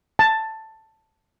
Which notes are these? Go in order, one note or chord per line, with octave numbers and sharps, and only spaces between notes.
A5